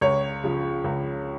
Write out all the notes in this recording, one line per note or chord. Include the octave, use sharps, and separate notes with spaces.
C#2 C#5
C#3 F3
C#2